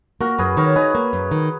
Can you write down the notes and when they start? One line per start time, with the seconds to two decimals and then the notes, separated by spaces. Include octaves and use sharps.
0.20 A#3 F#4 A#4
0.38 F#2 G#4 B4
0.57 D#3 A#4 C#5
0.75 D#4 G#4 B4
0.95 A#3
1.13 F#2
1.31 D#3